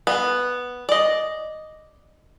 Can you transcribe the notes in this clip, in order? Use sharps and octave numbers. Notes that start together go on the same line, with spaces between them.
B3
D5 D#5